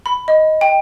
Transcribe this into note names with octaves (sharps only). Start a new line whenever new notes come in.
B5
D#5
G5